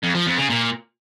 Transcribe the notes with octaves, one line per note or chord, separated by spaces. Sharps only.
F2
F3
F2
C#3
A#2